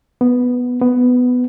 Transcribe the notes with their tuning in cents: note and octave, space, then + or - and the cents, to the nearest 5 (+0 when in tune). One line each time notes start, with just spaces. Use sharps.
B3 +0
B3 +10